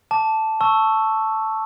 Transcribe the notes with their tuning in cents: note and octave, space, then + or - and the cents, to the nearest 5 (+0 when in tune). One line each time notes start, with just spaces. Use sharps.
A5 +0 D6 -10
A5 +0 C#6 +0 E6 +0